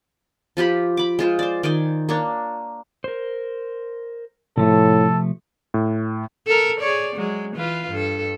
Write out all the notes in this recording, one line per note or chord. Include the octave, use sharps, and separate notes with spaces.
F3 F4 G4 B5
B5 D6
G#3 F4 C5
C5 D5
D#3 D5 G5 G#5
A#3 D4 C#5
A#4 C5
A2 C3 F3 A3 A4
A2
A4 A#4
G#4 C#5 D5
F#3 G#3
E3 F4 B4
G2 A4